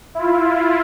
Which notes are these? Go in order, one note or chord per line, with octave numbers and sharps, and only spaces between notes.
E4 F4